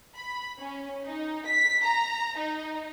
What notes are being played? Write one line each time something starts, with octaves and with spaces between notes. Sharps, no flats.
B5
C#4
D#4
B6
A#5
D#4